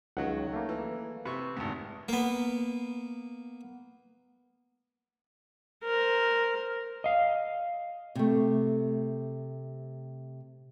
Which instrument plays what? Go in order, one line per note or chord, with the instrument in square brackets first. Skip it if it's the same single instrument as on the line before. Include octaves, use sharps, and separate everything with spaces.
[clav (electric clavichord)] C#2 F#5 [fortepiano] D#3 F#3
[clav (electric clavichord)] A3 A#3
[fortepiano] E3
[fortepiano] C3 C#6 [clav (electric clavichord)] B4
[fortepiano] G#1 D2
[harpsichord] A#3 B3
[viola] A#4 C5
[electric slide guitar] D#5 F5
[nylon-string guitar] C3 A3